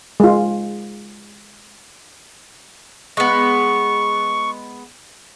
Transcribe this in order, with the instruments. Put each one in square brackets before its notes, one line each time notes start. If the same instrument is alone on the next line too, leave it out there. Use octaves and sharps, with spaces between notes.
[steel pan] G#3 F4
[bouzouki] G#3 B3 [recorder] C#6